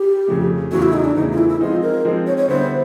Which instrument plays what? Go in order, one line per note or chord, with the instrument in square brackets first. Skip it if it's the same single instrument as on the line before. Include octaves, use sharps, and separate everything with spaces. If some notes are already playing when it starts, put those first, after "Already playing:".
Already playing: [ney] G4
[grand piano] F2 C#3 F3 A3
[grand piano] E2 C#3 E3 A3 [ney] F#4
[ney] E4
D#4
D4
[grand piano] E2 C#3 E3 A3 [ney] D#4
[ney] F4
E4
E4
[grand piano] F3 G#3 C4 D#4 [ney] F4
[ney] A#4
[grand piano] F3 G#3 C4 D#4
[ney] C#5
C#5
[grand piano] D3 G3 B3 E4 [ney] C5